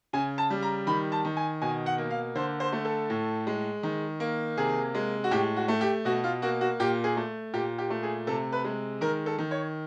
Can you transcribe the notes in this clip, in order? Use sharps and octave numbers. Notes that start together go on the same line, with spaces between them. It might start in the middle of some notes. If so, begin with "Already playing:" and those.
C#3 G#5
A5
G3
A#5
D#3 B5
A5
D#3
G#5
B2 G#5
F#5
A#3
F5
D3 C5
C5
A3
A4
A2
G#3
D#3
A#3
C3 G#4
G#3
F#4
A2 G4
F#4
A3
G4
B2 F#4
F4
A#3 F#4
F#4
A#2 G4
G#4
A3
A#2 G4
G4
A3
G#4
C3 A4
B4
G#3
D#3 A#4
A4
D#3
C#5